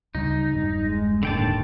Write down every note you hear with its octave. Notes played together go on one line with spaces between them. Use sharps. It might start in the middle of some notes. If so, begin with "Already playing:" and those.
D2 C#3 G3 D#4
E1 G2 G3
G#3
D#2 A2 D3 G5 A5